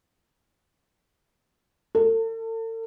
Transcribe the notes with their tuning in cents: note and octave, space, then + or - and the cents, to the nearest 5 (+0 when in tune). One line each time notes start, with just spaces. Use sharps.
A4 +40